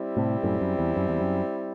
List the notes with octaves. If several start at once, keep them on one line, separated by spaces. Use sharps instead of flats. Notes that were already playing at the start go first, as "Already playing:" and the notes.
Already playing: G3 C4 E4
A2 C3
F#2 A2
F#2
E2
F#2
E2
F#2